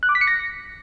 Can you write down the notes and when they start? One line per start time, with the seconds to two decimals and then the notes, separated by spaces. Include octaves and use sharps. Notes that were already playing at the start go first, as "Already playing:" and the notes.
0.03 F#6
0.09 D6
0.15 B6
0.21 C#7
0.27 A#6